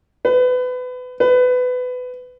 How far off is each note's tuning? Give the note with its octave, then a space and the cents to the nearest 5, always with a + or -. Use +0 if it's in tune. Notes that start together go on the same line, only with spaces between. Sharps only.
B4 +25
B4 +20